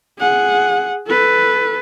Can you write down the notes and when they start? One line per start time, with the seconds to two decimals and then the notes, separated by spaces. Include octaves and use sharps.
0.19 G#4 F#5
1.07 A4 B4